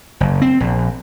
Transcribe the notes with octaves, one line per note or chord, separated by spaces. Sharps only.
F#1
C4
A#1